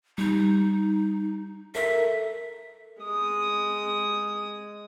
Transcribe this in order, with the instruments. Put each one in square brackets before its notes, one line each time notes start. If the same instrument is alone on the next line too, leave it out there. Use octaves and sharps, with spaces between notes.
[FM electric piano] G3 [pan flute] D#4
[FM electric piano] A4 A#4 [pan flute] E5
[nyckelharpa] G#3 D#6